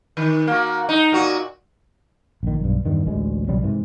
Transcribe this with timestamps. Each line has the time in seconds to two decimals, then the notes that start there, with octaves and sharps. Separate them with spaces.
0.17 D#3
0.47 A#3 F#4
0.89 D#4
1.12 A#2 F#4
2.43 A#1 D#3
2.60 B1 G2
2.86 E2 G2 D#3
3.07 A1 D2 G#3
3.48 B1 C#3 F#3 G3
3.63 G#2 C3 E3